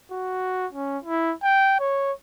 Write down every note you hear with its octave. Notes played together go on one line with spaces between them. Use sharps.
F#4
C#4
E4
G5
C#5